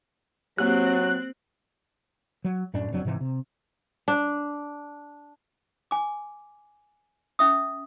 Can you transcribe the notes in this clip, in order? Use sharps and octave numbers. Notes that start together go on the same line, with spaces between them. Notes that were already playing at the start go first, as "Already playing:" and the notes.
F#3 A#3 C4 G4 F#6
F#3
F#2 A2 C#4 D4
F#1 F2 F#3 D4
G#2 C3 E3
C3
D4
G#5 D6
C#4 E5 D#6